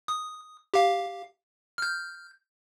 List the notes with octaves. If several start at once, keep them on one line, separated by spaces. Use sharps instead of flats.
D#6
G4 F5
F6 G6